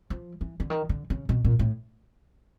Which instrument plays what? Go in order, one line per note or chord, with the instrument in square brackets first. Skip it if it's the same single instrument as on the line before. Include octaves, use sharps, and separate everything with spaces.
[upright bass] F3
E3
D3
D#3
D3
C#3
B2
A#2
A2